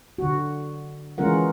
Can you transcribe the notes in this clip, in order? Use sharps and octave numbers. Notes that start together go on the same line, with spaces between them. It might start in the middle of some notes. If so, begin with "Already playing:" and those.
D3 F#4
E3 G#3 C#4 F4 A#4 F#5